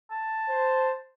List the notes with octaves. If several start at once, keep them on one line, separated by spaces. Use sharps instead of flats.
A5
C5